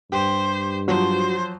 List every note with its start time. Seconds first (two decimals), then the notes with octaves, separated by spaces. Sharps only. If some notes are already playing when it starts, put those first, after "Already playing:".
0.12 G2 G4 C5
0.88 F3 F#3 F#4 C5